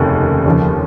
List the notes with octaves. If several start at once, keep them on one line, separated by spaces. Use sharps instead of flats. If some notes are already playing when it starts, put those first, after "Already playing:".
Already playing: F1 D#2 C#3
D#2 C#3 F3